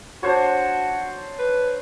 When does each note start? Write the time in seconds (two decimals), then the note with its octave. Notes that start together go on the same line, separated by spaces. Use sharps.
0.23 D4 F#4 C5 C#5
1.39 B4